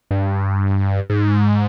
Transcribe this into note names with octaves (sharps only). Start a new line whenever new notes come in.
G2
G#2